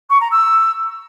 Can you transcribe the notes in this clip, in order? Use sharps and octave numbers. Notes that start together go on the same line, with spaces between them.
C#6
A#5
E6